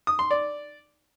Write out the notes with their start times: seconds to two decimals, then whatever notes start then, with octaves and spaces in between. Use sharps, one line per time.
0.07 D#6
0.19 C6
0.31 D5